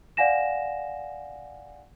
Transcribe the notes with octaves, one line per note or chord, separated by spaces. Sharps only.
D5 F5 F#5 G#5 A#6 E7